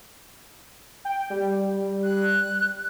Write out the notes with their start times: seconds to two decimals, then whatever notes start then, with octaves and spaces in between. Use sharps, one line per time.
1.05 G5
1.30 G3
2.04 F#6